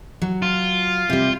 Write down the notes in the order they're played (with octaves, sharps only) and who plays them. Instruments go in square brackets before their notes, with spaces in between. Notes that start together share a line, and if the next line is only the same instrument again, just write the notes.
[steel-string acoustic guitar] F#3
[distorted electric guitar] F4
[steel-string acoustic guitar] C3 G3